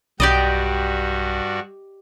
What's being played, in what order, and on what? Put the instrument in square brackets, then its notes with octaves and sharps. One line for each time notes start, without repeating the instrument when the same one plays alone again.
[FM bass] B1 [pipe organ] G2 G3 F#4 [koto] G4 D5 D#5